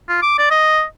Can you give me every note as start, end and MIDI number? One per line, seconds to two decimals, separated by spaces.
0.08 0.20 65
0.22 0.35 86
0.38 0.48 74
0.51 0.83 75